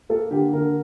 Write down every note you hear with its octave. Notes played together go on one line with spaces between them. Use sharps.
A#3 A4
D3 G4
D3 A#4